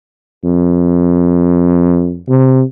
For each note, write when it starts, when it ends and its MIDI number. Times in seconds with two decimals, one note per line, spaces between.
0.44 2.19 41
2.28 2.63 48